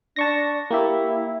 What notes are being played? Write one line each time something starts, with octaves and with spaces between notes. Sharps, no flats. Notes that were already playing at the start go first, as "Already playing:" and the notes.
D4 A5 C#6 A#6
A#3 E4 G4 E5